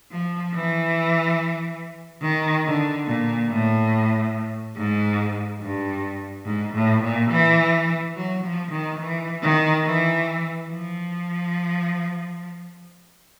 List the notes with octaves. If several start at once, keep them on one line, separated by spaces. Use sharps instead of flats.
F3
E3
D#3
D3
A#2
A2
G#2
G2
G#2
A2
A#2
E3
F#3
F3
D#3
E3
D#3
E3
F3